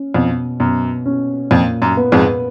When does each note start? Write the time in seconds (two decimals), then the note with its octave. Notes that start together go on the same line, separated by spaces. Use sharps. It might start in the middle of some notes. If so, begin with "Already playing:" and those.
Already playing: C#4
0.14 F2 B2
0.60 F#2 B2
1.06 C#4
1.51 F2 A#2
1.82 F#2
1.97 B3
2.12 F2 G#2